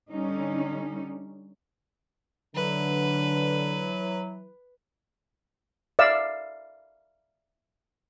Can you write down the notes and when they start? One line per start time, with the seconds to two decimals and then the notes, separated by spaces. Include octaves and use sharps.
0.11 D3 G3 C#4 D#4
2.56 D3 E3 F#3 B4
5.99 D5 E5 F5 E6